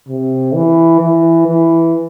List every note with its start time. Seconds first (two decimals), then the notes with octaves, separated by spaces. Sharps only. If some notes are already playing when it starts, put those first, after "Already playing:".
0.09 C3
0.54 E3
1.01 E3
1.47 E3